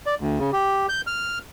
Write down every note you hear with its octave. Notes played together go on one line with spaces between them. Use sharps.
D5
D2
C#3
G4
G6
F6